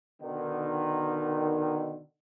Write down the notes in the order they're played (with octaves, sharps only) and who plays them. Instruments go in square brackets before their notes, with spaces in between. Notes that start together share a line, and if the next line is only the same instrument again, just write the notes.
[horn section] B2 D3 D#3